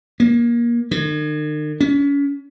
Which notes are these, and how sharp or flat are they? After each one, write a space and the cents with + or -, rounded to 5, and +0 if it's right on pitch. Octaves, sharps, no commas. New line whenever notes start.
A#3 +25
D#3 -45
C#4 +35